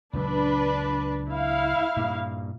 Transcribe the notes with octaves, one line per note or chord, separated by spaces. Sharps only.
C#2 A#2 F#3 D4 B4
E4 F5
G2 A#2